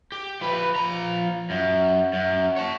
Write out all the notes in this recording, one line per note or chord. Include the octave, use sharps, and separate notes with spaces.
G4
F3 B4
F3 A#5
F#2
F#2
C#5 A5